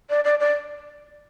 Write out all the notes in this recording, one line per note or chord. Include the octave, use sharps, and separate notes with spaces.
D5
D5
D5